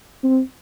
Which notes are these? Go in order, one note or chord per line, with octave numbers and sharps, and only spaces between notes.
C4